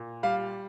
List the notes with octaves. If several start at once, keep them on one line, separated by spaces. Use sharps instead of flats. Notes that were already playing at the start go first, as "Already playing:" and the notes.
Already playing: A#2
G3 F5